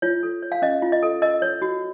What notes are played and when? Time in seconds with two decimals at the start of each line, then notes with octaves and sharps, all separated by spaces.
0.02 F4 C#5
0.23 A4
0.43 C#5
0.52 F5
0.62 C#4 D#5
0.82 F4
0.92 D#5
1.03 A4
1.22 A#4 D#5
1.42 C#5
1.62 F#4